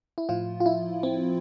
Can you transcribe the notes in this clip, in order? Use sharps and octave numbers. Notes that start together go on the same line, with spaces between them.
E4
A2 F3 F4
F4
E4
C4